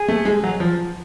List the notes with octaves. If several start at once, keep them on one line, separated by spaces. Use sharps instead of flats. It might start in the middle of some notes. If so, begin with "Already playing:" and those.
Already playing: G#4
A3
G#3
F#3
F3